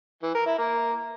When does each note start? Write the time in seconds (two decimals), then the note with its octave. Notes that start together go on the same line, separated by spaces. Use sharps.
0.23 E3
0.35 A#4
0.46 E4
0.58 A#3